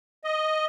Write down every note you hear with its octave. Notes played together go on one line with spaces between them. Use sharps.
D#5